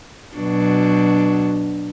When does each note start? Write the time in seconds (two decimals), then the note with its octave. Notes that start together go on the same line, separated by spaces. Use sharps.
0.36 B2 F#3 D4